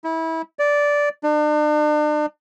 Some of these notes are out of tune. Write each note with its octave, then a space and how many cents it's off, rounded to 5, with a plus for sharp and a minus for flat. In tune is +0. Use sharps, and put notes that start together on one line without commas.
E4 -25
D5 -10
D4 +40